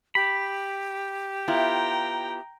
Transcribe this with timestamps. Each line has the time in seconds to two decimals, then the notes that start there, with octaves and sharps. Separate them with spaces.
0.15 G4 B5
1.48 B3 E4 F4 G5 A#5